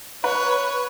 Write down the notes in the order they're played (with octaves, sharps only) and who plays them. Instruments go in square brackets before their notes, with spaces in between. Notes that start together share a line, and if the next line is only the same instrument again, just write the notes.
[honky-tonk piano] B4 [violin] C#5